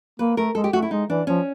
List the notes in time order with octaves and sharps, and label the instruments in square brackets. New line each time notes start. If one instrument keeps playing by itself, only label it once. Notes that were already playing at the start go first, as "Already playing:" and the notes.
[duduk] A#3 [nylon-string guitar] B4
[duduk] A3 [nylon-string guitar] A#4
[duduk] G#3 [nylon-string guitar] A4
[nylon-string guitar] G4
[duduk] A3 [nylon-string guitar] F#4
[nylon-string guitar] E4
[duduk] G#3 [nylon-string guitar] D#4
[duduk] E3 [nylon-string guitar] D4
[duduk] F3 [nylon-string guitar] C#4